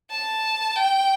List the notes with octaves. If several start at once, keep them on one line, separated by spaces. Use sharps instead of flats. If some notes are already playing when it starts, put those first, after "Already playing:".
A5
G5